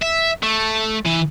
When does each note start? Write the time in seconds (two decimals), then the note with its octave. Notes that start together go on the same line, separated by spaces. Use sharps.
0.02 E5
0.43 A3
1.06 E3